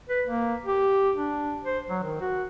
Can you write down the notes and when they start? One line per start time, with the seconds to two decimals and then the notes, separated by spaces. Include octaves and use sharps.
0.09 B4
0.27 A#3
0.66 G4
1.16 D4
1.65 C5
1.89 F#3
2.03 D#3
2.21 F#4